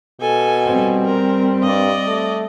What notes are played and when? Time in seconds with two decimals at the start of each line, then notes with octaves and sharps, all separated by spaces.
0.20 B2 A4 G#5
0.66 G3 C4
1.05 A#4
1.63 G2 D5 D#5
2.08 A3